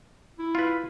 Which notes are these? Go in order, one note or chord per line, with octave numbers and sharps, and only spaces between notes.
E4
F4 B4